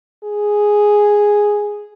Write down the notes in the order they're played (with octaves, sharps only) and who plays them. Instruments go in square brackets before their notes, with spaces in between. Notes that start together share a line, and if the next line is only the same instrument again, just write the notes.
[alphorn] G#4